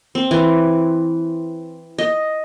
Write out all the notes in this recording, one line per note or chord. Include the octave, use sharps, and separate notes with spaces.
C4
E3
D#5